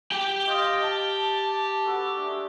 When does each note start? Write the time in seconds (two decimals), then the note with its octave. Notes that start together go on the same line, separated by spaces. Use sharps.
0.12 G4 G5
0.48 F4 D#5
0.83 A5
1.85 B3 F#4 A4
2.17 G#3 A3 D4